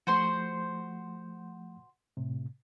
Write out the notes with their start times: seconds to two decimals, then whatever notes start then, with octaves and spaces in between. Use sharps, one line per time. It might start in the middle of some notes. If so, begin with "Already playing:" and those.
0.07 F3 A3 F#4 C5 C6
2.17 A2 C3